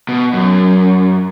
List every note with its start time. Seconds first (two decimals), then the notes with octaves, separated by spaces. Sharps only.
0.09 B2
0.33 F#2